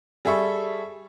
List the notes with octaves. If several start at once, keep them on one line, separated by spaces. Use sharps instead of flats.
G3 G#4 A4 E5 B5 C#6